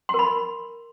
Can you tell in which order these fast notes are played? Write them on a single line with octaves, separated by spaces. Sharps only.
C6 A#4 B5